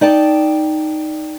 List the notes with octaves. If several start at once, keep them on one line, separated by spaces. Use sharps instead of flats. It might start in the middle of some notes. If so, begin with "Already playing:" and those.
D#4 D5 G5 A5